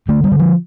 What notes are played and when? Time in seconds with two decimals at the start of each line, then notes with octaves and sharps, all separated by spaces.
0.08 D3 A3
0.24 G3
0.32 D3
0.39 F3